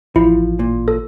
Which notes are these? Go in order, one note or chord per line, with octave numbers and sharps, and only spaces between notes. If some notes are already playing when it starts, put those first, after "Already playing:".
A1 F3 E4
A#2
A4